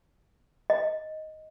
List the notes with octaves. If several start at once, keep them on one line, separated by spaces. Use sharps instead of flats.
D#5